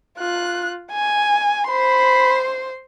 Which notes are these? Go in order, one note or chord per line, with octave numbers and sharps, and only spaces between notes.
F4 F#6
G#5
C5 B5 C6